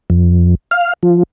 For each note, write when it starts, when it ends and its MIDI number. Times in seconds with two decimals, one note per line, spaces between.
0.10 0.55 41
0.71 0.93 77
1.03 1.23 53